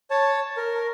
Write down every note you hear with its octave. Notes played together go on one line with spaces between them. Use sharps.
C#5 A5
A#4